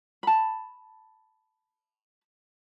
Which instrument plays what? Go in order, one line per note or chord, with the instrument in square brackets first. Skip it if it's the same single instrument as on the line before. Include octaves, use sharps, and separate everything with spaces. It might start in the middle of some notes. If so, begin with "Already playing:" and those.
[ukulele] A5 B5